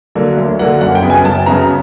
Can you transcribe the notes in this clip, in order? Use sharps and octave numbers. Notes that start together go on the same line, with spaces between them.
D3 F#3 A#3
D2
D3 F#3 A#3 F#5
F#2 F#5
G5
C#3 F#3 B3
G#5
F#2 A5
C#3 F#3 B3 A#5